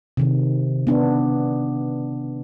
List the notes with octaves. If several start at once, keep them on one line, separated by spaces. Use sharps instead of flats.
C3 D#3
B3 D4